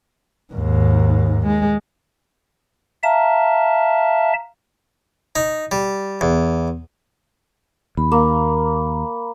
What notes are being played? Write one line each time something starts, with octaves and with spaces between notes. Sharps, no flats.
D#2 G#2
G#3
E5 F5 A5 A#5
D#4
G3
E2
D#2 B5
A#3